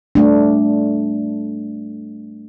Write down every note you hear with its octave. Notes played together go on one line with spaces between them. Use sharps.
G3 A3 D4